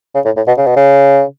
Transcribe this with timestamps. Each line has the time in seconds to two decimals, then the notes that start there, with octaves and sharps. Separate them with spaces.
0.15 C#3
0.25 A2
0.36 A2
0.47 B2
0.57 C#3
0.66 B2
0.76 C#3